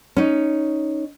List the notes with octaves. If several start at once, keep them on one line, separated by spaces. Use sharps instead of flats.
C#4 D#4